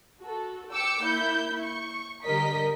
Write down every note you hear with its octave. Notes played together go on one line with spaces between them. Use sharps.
F#4 A4
G5 D6 E6 C#7
A#3 E4 G6
C#6
D3 G3 A#4 D#5 B6